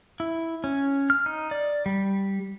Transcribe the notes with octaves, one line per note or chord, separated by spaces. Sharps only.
E4
C#4
F6
D#4
D5
G3